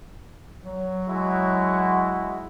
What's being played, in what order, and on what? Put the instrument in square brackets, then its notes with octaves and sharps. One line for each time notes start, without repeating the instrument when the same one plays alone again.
[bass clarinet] F#3
[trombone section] G#3 E4 F#4